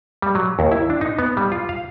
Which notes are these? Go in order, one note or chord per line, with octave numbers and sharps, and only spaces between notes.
G3
F#3
D#2
E4
D4
D#4
B3
G3
F4
F5